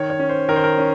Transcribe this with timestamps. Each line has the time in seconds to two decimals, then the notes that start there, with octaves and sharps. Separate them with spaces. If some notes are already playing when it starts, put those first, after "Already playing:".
Already playing: D#3 C#5
0.10 C#5
0.19 C#4
0.29 C5
0.48 D#3 A#4
0.56 C5
0.64 A#4
0.78 C#4